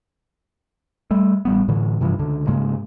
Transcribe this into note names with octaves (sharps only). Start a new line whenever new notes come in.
G3 A3
A1 G3 B3
A2 D3 E3
G2 C3 E3 F3
C#2 D3
G#2 C#3 G#3 A#3